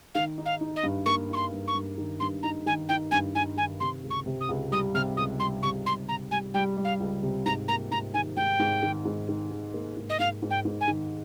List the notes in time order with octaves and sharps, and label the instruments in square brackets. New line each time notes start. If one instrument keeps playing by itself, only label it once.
[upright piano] D#3 [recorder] F5
[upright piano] D#4
[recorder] F5
[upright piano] D#4
[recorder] D#5
[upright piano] G2
[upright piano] A#3 [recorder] C#6
[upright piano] D#4 [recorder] C#6
[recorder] C6
[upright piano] G2
[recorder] C#6
[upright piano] G2
D#3
[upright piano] G2 [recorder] C6
[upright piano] D#4 [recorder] A#5
[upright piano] D#3 [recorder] G#5
[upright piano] D#4 [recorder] G5
[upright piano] G2 [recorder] G#5
[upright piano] D#4 [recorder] G#5
[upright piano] D#3 [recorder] G#5
[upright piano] C3 [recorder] C6
[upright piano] C#2
[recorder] C#6
[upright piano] C3
[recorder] D#6
[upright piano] C#2
[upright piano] G3 [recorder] D#6
[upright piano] C3 [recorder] F6
[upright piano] C#2 [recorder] D#6
[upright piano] G3 [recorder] C6
[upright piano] C3 [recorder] C#6
[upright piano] C#2 [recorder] C6
[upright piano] C3 [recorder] A#5
[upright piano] G3 [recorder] G#5
[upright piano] G3 [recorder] G5
[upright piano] G3
[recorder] F5
[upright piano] C#2
C3
[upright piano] G#2 [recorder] A#5
[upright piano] A#3 [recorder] A#5
[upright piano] G#2 [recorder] A#5
[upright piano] D#3 [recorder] G#5
[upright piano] G#2 [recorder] G5
[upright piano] G#2
D#3
G#2
D#3
D#3
A#3
G#2
[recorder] D#5
[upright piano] G#2 [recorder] F5
[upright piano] G#2
[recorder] G5
[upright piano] G#2
[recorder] G#5
[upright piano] D#3